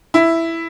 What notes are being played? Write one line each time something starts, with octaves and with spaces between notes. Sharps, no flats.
E4